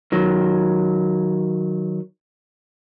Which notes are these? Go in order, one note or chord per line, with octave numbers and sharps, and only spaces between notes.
D#3 F#3